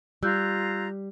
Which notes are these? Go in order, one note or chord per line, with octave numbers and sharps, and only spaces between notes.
G3 F4 A#5 E6 F#6 G6